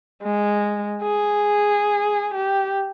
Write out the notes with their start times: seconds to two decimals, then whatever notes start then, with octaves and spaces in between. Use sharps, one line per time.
0.23 G#3
1.03 G#4
2.34 G4